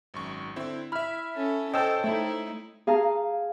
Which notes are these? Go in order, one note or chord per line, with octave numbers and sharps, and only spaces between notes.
G#1 F#2 C#6
D3 C4 E4
E4 E5 B5 F6
C#4 A4
A4 C5 C#5 D#5 G5 A5 E6 G6
A3 D#4 E4
G#4 F5 A5 A#5